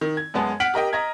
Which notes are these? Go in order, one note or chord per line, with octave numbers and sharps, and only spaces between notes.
D#3
G#6
F#2 G#3 B3 A5
F#5 F6 B6 D7 F#7
G4 A#4 D#5 G5
D#5 A#5 G#6